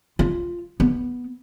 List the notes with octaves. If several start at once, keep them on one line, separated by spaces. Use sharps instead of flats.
F4
B3